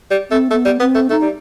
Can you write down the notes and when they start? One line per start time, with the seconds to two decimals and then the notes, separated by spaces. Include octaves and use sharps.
0.11 G3
0.31 A3 C4
0.51 A3 B3
0.65 G3
0.80 B3 C4
0.95 A3
1.10 A3 D#4
1.22 G3